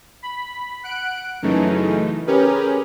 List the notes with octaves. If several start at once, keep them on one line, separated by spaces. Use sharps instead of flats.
B5
F#5 F#6 D7
F#2 C#3 E3 A3 D#4
C#4 G4 G#4 A#4 B4